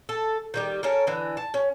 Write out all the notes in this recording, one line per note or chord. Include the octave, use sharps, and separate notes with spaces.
A4
D#3 G3 G4
C#4 A4 A#4
D3 E3
A5
C#4